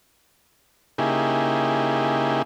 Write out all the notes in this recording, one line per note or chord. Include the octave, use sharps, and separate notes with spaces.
C#3 A#3 D#4 E4 G4 G#4